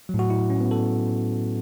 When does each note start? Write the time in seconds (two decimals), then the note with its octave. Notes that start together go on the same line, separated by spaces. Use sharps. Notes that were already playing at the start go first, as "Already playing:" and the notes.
0.09 F#3
0.14 A2
0.19 F#4
0.30 E4
0.50 C#4
0.61 B3
0.71 A4